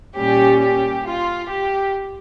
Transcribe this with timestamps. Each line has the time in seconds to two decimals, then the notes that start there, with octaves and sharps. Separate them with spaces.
0.17 A#2 G3 C#4 G4
0.61 G4
1.06 F4
1.49 G4